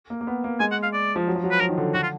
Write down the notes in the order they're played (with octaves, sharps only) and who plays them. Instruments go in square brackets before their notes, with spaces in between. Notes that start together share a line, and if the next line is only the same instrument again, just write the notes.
[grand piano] A#3
A#3
B3
A#3
[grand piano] G#3 [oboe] G#5
[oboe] F#5
F5
D5
[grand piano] F3
F#3
F3
F#3
[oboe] B4
[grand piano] F3 [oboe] A#4
[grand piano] D#3
D3
[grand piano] D3 [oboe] F#4
[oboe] F4